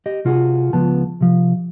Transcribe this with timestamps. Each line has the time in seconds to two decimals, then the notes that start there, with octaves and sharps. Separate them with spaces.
0.06 G4 D#5
0.25 C3 F4 F#4 G#4
0.73 C#2 F3 B3 A5
1.21 C3 F3